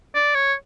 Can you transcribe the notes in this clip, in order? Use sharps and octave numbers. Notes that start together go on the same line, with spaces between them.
D5
C#5